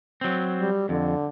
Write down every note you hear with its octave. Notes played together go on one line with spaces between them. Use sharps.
F#3 C4
G3
F2 D3